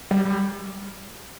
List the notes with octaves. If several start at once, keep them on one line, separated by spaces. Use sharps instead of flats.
G3
G3